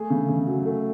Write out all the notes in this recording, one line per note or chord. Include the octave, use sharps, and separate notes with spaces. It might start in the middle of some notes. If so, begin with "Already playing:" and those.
Already playing: A3 G#4
C#3
C#3
F#3
A3